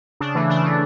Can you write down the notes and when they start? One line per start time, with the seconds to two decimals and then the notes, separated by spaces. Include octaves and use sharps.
0.20 C#3 D4
0.35 E3 A3
0.50 C#3 D4
0.64 E3 A3